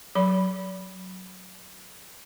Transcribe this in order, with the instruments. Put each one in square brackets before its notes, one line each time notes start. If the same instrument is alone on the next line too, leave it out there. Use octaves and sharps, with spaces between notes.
[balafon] F#3 B5